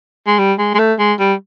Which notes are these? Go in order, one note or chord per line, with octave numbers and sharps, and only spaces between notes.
G#3
G3
G#3
G#3
A3
G#3
G3